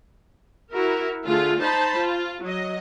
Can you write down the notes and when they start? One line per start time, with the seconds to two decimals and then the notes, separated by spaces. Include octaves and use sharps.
0.71 E4 F#4 A#4
1.25 D3 A3 F4 G#4
1.59 D#4 C5 A5 B5
1.97 F4
2.42 F#3 D#5